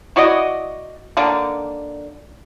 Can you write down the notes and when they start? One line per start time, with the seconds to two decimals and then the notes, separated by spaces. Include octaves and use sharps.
0.16 E4 F#4 D5 D#5
1.17 D3 D#3 A#3